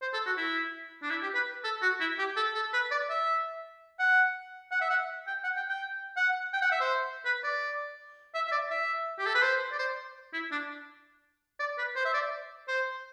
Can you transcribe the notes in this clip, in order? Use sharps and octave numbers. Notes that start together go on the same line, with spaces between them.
C5
A4
F#4
E4
D4
E4
G4
B4
A4
F#4
E4
G4
A4
A4
B4
D5
E5
F#5
F#5
E5
F#5
G5
F#5
G5
G5
F#5
G5
F#5
E5
C5
B4
D5
E5
E5
D5
E5
G4
A4
B4
C5
D5
C5
E4
D4
D5
B4
C5
E5
D5
C5